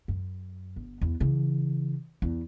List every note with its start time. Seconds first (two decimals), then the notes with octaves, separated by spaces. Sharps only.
0.08 F#2
0.76 G1
1.01 E2
1.20 C#3 E3
2.22 E2